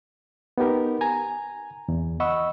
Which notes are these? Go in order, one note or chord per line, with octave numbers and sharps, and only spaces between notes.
B3 D#4 G4 A#4
G#5 A#5
E2
D#5 F#5 B5 C#6 E6